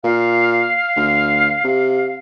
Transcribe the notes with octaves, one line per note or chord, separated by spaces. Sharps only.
A#2 F5
D2
C3